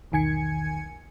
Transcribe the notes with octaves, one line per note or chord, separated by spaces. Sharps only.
B1 E2 D#3 G#5 G#6 C#7